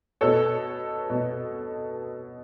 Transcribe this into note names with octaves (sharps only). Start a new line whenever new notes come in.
B2 A4 C#5
B2